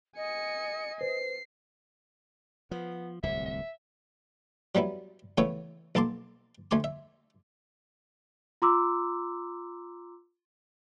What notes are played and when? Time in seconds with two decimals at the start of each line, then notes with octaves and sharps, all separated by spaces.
0.16 D#5 G#5 C#7
1.01 B4 C5 C7
2.71 F3 B3
3.23 D1 C2 C3 E5
3.46 E5
4.75 F#3 G3 B3 E4
5.38 C#3 E3 A3 B3 C#5 E5
5.95 B1 A#3 A4 A5 C6 D6
6.71 D2 A3 G#5 C6 D6
6.84 E5
8.62 F4 A#5 C6 D6 E6